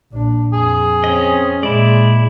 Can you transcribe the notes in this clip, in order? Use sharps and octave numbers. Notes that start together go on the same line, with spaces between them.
A#1 D4
F2 G#4
C4 C#4 D#5
A#2 G#3 E4 D5